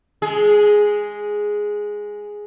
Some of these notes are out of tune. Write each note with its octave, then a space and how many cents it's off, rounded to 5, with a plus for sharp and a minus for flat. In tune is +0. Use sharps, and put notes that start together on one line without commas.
G#3 +0 G#4 +0